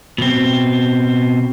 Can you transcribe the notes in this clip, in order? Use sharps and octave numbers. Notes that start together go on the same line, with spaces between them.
B2 C4